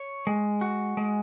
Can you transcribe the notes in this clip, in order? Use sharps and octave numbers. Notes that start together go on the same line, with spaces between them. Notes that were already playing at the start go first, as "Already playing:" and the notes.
Already playing: C#5
G#3
F#4
G#3